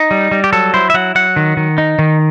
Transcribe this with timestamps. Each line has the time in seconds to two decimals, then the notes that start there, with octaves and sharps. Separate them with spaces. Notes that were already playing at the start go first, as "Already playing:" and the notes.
Already playing: D#4
0.11 G3
0.31 G3
0.44 G4
0.53 F#3 A4
0.74 E4 C5
0.90 E5
0.94 F#3 F#5
1.15 F#3 F#5
1.36 D#3
1.57 D#3
1.78 D#4
1.99 D#3